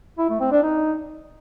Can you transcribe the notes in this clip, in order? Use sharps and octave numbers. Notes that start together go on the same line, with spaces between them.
E4
A3
C4
D4
D#4